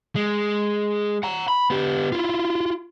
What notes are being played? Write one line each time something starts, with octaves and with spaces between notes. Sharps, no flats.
G#3
F#5 A#5
B5
B3 G4
E4 F4